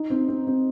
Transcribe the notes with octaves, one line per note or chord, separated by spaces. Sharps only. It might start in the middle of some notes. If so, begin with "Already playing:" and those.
Already playing: D#4
C4
C4
C4